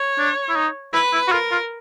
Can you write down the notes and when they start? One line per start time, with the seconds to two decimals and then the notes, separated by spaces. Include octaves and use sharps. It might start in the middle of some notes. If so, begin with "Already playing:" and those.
Already playing: C#5
0.19 D4
0.49 E4
0.56 D#4
0.94 E4 B4
1.13 E4
1.28 F#4
1.32 F4 A#4
1.51 F4